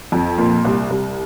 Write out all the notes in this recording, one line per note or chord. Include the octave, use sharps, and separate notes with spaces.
F2
A#2
C2
C2